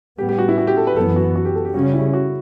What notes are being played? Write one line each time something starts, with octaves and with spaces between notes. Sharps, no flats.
A2 G3 B3 G4
G4
F#4
E4
F#4
G4
A4
B4
F#2 E3 B3 A4
F#4
F#4
G4
A4
G4
C#3 G3 C#4 F#4
E4
F#4